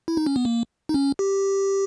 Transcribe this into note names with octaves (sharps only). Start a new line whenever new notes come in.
E4
D#4
C#4
B3
A#3
D#4
C#4
G4